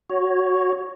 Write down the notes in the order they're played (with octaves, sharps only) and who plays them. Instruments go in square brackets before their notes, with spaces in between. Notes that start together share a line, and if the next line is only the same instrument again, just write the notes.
[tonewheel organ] F#4 C#5